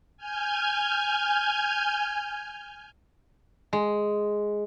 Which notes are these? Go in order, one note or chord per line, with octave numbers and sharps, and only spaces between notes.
G#5 F6 G6 G#6
G#3